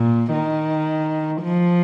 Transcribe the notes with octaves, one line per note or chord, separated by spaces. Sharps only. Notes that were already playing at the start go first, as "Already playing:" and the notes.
Already playing: A#2
D#3
F3